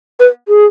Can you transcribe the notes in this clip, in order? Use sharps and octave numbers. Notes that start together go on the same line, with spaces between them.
B4
G#4